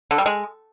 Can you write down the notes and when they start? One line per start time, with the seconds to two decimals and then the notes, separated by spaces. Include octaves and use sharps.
0.11 D3
0.18 G3
0.26 G#3